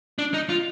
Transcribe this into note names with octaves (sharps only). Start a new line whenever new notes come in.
D4
D#4
F4